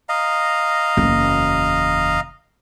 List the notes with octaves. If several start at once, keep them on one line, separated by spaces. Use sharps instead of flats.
D#5 F5 A#5
F#1 E2